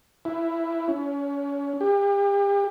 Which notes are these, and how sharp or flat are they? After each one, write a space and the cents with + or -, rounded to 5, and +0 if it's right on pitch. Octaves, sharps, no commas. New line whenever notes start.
E4 +10
C#4 +30
G4 +35